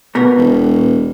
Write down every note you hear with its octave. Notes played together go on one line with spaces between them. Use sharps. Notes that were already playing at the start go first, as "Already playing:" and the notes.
B2 B3 A#4
E1